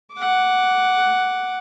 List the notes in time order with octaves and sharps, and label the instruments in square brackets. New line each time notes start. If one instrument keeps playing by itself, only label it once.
[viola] F#5 D6